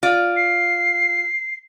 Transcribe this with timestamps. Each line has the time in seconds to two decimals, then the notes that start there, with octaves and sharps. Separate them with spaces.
0.03 F4 D5
0.36 C7